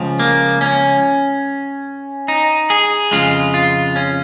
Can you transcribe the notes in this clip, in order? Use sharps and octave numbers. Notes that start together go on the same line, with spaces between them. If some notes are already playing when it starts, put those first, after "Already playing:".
Already playing: C#2 C#3 F3
A#3
C#4
D#4
G#4
F2 C#3 G#3 F4
F4
C#4